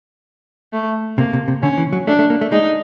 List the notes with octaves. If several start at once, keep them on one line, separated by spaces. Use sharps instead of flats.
A3
C3 A#3
C3
C3
D3 C#4
E3
F#3
A3 D4
A3
A#3
A3
G#3 D#4